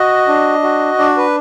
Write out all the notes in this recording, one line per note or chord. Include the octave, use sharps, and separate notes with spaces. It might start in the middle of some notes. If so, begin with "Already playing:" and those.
Already playing: F#4 D#5
D4
F#4
D4 D5
B4